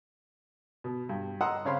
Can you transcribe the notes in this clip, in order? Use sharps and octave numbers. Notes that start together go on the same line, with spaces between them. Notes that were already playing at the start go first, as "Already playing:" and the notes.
B2
G2
D#5 F#5 A#5 C6 D#6 E6
C#3 C4 C#5 F5 B5 C6